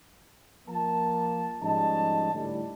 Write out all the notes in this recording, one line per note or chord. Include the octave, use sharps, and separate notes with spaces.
F3 A#3 A5
G#2 F3 G3 C#4 D#5 A5
A2 D3 G3